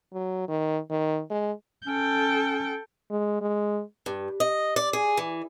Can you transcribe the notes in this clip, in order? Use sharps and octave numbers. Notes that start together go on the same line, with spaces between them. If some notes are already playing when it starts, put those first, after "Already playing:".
F#3
D#3
D#3
G#3
C#4 A4 G5
G#3
G#3
G2
D#5
D5
G#4
E3